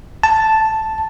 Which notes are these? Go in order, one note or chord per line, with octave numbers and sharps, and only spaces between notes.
A5